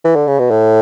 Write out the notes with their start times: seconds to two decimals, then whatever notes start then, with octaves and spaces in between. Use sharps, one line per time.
0.04 E3
0.15 D3
0.27 C#3
0.39 B2
0.51 A2